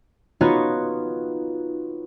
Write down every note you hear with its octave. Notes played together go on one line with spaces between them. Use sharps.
B3 D#4 F4 F#4 C#5